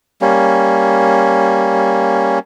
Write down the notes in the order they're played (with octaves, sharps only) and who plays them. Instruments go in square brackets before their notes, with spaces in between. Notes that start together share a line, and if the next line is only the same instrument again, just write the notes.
[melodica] G3 A#3 C#4